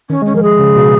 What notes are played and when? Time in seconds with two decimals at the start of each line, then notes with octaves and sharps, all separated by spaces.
0.10 D#3 C#4
0.22 G#3
0.26 C#4
0.34 F3 A#4
0.43 G#4
0.59 C#3
0.76 B2